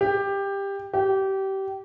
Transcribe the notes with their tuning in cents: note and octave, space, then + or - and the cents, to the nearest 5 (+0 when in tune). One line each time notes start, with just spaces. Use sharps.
G4 +15
G4 -25